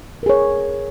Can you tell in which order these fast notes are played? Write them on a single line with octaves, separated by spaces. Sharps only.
A#4 G#4 C#5